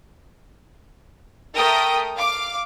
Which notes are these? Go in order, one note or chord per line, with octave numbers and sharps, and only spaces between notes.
A3 A#4 G5 D#6
F5 D6